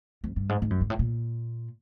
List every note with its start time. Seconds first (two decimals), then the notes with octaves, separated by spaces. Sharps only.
0.24 F2
0.36 G2
0.49 G#2
0.62 G#2
0.70 F#2
0.81 G#2
0.90 A2
0.99 A#2